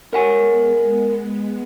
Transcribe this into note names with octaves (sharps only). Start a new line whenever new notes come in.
G#3 B3 A#4 F#5 G#5